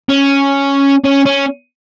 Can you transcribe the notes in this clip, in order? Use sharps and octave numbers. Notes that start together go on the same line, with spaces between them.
C#4
C#4
C#4